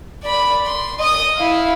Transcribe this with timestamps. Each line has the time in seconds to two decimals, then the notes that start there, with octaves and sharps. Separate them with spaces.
0.24 D5 B5
0.66 C6
0.99 D#5 D#6
1.36 E4 F5